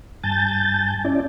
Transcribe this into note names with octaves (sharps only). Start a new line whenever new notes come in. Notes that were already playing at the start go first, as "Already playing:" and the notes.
G2 G#5 A5 G6 A6
C#4 E4 D5